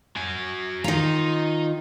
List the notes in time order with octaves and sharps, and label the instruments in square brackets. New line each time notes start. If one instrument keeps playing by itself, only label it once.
[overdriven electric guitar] F#4 G#5
[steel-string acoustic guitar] D#3 F4 [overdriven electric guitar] D#5 A#5